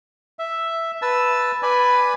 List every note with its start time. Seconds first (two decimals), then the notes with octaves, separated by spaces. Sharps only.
0.39 E5
1.02 B4 A5 E6
1.63 B4 D5 G#5 B5